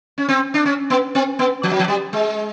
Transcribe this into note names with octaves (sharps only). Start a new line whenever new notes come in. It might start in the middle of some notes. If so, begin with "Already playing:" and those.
C#4
C4
D4
C#4
B3
C4
B3
F3
F#3
F3
G3
G#3